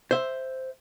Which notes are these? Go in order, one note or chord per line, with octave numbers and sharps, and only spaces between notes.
C5 E5